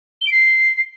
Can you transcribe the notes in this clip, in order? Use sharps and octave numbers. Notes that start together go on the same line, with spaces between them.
G7
D7
C7